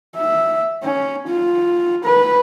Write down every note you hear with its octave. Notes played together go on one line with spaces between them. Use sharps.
E5
C#4
F4
B4